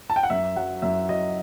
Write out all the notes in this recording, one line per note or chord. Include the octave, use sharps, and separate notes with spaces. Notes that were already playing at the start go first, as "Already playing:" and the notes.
A5
G5
F#5
F#2 E5
F#3 F#5
F#2 E5
F#3 D#5